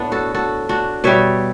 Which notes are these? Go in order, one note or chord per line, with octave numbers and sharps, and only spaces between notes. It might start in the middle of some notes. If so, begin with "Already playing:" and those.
Already playing: A2 B3 D4
F#4 A4
F#4 A4
D4 F#4
B2 G3 C#5 E5